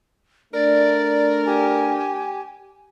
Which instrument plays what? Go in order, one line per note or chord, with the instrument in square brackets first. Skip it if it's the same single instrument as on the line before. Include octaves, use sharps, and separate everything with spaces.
[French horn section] A3 D4 [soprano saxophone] A#4 [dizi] D5
[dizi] G4 [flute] G#5